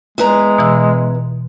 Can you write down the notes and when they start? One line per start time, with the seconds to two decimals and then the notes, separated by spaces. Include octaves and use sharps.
0.18 E2 G#3 B4 A#5
0.58 B2 E3 E6